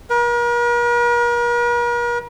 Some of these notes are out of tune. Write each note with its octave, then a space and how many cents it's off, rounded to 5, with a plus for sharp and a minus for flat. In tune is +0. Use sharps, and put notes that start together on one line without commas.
A#4 +45